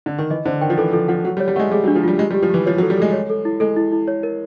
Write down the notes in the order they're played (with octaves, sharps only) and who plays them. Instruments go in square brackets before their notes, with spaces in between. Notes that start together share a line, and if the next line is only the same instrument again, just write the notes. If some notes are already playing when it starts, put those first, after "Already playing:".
[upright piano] D3
D#3
[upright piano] E3 [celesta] D#5
[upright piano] D3 [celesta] C5
[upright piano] D#3 [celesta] G5
[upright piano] F3
[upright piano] E3 [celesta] A4
[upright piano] F3 [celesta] A4
[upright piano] F3 [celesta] F#5
[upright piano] F#3 [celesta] F#5
[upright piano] G3
[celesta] C#5
[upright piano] G3
[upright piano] G#3 A3 [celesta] F#5
[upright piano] G3 [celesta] G#4
[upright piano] F#3
[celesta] D4
[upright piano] F3
[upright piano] G3 [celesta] F4
[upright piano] G#3 [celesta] G4
[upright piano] G3
[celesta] G4
[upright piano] F3
[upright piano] E3 [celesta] G4
[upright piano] F3 [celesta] C#5
[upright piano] F#3
[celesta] A4
[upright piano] G3
[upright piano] G#3 [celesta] A4
[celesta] C#5
A4
E4
[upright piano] G#3 [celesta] A4
[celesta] E4
E4
C#5
A#4